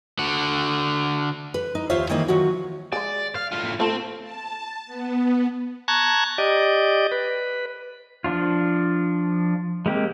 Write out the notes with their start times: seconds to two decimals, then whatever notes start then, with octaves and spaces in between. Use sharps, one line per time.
0.19 D3 F#4
1.54 B4
1.75 D#4
1.90 D#2 F4 C5 C#5 E5 F5
2.09 D#3 E3 A#3 D#4 E4
2.28 D#3 F3 F#3 F#4
2.92 G#3 G#4 D5
3.35 F5
3.52 A2 F4
3.80 A3 C4 F4 A4
4.21 A5
4.86 B3
5.88 A5 A#5 C#6 F#6 G#6
6.38 G4 D5 D#5
7.12 B4
8.24 F3 D4 F4
9.86 G#3 A#3 C4 G4